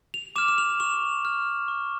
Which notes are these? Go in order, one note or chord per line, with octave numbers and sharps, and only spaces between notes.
F7
D6 F6 E7
E7
F7
C#6 F7
F6
C#6